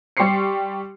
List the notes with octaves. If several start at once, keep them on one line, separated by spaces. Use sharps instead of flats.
G3 G4 C6 C#6 C7 C#7